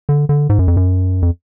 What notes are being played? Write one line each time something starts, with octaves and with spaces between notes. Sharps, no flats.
D3
D3
G#2
F#2
F2
F#2
F2